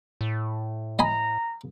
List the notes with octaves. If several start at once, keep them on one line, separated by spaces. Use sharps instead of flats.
A2
D#5 G#5 A#5 B5